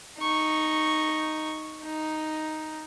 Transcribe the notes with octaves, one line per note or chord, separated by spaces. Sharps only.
D#4 C#6
D#4